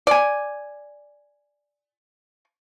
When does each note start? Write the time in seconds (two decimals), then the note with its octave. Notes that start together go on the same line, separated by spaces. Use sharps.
0.07 D5 G#5